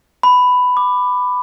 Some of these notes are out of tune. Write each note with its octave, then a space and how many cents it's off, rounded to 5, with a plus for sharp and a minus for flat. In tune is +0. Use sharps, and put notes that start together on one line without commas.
B5 +10
D6 +20